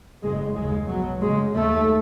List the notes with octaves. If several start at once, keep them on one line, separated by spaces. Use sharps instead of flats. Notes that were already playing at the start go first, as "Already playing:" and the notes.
F#1 F#2 C#3 G#3
D#2 C#3 G#3
B1 B2 F#3
F#1 F#2 C#3 G#3
D#2 C#3 A3